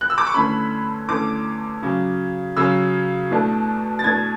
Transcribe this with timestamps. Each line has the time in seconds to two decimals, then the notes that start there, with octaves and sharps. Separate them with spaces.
0.01 F#6
0.10 E6
0.18 D6
0.27 C#6
0.34 E2 D3 A3 C#4 B5
1.08 E2 D3 A3 C#4 D6
1.82 C#3 F#3 C#4
2.57 C#3 F#3 C#4 E6
3.30 E2 B2 A3 D4
3.99 A6
4.04 E2 B2 A3 D4 G#6